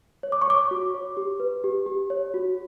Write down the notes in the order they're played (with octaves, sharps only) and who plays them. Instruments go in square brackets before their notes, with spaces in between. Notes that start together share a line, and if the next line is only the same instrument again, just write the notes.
[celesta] C#5
D6
C#6
C#5 D6
F#4
C#5
G4
B4
G4
G4
C#5
F#4